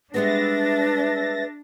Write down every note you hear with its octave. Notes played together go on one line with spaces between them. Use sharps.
G3 G#3 B3 D4 B4 E5 A6 A#6